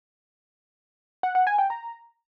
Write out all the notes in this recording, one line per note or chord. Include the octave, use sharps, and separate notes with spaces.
F#5
F#5
G#5
G5
A#5